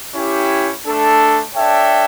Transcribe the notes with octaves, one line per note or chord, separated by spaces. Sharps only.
C#4 E4 G4
A3 D4 A4
D4 A4 C#5 E5 G5